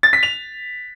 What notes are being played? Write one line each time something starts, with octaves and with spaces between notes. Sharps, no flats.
A6
B6
F7